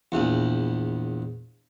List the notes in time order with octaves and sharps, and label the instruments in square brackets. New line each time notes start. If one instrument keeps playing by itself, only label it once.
[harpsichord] A#1 E2